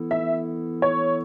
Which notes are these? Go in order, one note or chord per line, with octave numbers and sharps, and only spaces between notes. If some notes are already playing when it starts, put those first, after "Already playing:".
Already playing: E3 B3 E4 A4
E5
C#5